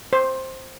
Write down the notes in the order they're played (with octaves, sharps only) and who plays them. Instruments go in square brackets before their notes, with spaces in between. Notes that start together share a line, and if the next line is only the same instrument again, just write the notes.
[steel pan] C5